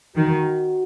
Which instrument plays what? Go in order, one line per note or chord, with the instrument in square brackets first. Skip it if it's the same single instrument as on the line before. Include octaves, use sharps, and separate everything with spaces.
[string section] D#3 [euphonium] F#4